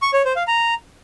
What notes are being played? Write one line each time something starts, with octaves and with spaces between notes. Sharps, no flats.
C#6
C#5
C5
F5
A#5